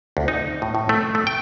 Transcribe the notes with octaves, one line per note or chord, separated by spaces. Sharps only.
D2
D#4
A2
A2
A3
A3
G5